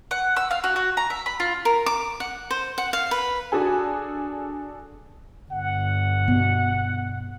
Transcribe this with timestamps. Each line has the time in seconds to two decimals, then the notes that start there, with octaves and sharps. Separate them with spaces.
0.11 F#5
0.37 E6
0.51 F5
0.64 F#4
0.76 F#4
0.97 A#5
1.10 E5
1.26 B5
1.40 F4
1.65 A#4
1.86 D6
2.20 F#5
2.51 C5
2.78 F#5
2.93 F5
3.11 B4
3.52 D4 F#4 G#4 A4 G#5
5.52 G1 F#5
6.28 B2